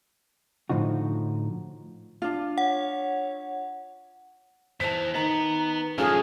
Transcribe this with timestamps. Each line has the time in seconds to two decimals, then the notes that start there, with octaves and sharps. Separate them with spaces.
0.70 A2 D3 F3 D#4 F#4
2.22 D4 F4
2.58 C#5 F#5
4.80 E2 E3 C5 A5 B6
5.14 D#3 B3 A#5
5.98 F#2 A2 C#4 F4 G#4 A4 F6